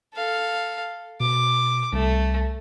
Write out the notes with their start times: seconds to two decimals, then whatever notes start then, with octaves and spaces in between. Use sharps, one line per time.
0.14 A4 F5
1.20 B2 D6
1.93 C2 A3